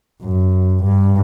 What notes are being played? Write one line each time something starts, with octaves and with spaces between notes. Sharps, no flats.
F#2
G2